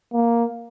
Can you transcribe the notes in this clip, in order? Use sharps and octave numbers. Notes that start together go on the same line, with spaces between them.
A#3